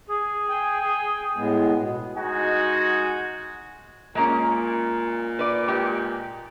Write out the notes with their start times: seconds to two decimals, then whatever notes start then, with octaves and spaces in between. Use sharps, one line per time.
0.07 G#4
0.49 G5 G#5
1.36 A2 G#3 B3
1.78 B2
2.16 G#3 D#4 F#4 G#5
4.15 A#2 G#3 A#3 C#4
5.39 B4 D5
5.68 G#3 G4